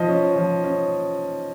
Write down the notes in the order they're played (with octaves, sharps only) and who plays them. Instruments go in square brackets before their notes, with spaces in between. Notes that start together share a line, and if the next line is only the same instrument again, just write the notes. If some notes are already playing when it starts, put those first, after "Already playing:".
Already playing: [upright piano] F3 D#5
C#4
F3
C#4